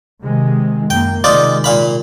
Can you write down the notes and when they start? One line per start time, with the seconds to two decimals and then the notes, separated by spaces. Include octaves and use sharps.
0.23 C3 D#3 G#3
0.90 F#2 A#3 G5
1.24 C3 D#3 G#3 D#4 F4 D5
1.64 A#2 F5 B5